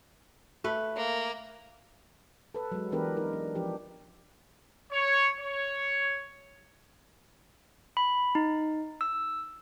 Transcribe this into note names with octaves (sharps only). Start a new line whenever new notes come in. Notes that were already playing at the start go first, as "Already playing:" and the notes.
A3 B4
A#3
A4 B4
F#3 G#3
E3 B3 D4 G4 A#4 B4
D#4 A#4
D4
F3 D4 G4
C#5
C#5
B5
D#4
E6